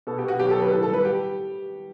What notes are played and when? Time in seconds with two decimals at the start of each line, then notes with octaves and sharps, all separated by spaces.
0.07 B2 A4
0.18 G4
0.23 B2
0.28 F#4
0.40 F#3 G4
0.50 A4
0.56 F#3
0.62 B4
0.72 A2 A4
0.83 A4
0.88 G3
0.93 B4
1.05 G4